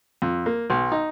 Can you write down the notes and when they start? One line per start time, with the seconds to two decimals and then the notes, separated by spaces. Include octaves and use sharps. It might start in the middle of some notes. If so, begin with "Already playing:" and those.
0.22 F2
0.46 A#3
0.70 B1
0.92 D#4